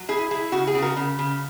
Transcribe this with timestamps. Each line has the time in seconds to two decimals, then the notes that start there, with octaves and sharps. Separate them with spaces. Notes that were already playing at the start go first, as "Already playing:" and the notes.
Already playing: F#3
0.09 E4 G#4
0.31 E4 G#4
0.52 C#3 F#4
0.67 G#4
0.75 C#3
0.82 F#4 A#4
0.97 C#3
1.19 C#3